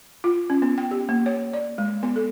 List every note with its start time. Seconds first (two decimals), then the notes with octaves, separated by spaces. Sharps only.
0.24 F4
0.50 C#4
0.62 B3
0.78 G5
0.91 G4
1.09 A#3
1.26 C#5
1.53 D5
1.78 G#3
2.03 B3
2.16 A4